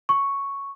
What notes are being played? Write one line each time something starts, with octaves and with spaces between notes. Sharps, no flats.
C#6